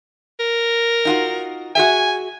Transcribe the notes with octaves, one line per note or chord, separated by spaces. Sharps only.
A#4
D#4 F4 F#4
F#4 G#4 E5 G#5